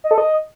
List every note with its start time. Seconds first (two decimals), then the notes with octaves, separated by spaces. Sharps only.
0.04 D#5
0.11 A4
0.18 D#5